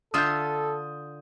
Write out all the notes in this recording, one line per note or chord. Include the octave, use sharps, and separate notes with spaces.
D3 F4 A4 E5 D#6 G6